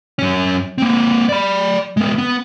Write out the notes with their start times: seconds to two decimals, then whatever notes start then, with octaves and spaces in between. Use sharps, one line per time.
0.19 F#2 C#4
0.78 A#3 C4
1.29 D5 B5
1.97 G#3 B3
2.18 B3